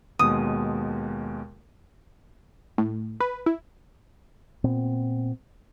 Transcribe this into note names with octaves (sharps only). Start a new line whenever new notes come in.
D#2 B2 G#3 D#6
A2
B4
E4
A#2 B3 C4